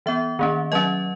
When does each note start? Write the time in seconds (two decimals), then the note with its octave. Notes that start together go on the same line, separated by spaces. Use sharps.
0.06 E3 B3 E5
0.39 D#3 A#3 C#4
0.72 F#3 C#4 D#5